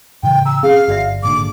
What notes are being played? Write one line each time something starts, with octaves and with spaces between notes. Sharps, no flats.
A2 C#3 E3 G5
A#5 E6
C4 C#4 G#4 F5
G1 F#4 D5 E5
G#1 A#2 D3 D6